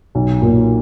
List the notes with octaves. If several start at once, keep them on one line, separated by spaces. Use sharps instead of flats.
B1
A#2